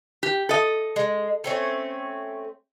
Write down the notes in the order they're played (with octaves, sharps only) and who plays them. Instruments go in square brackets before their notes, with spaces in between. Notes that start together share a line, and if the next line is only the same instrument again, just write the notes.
[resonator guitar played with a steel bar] G4
A4 D#5
[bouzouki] G#3
A3 C4 C#4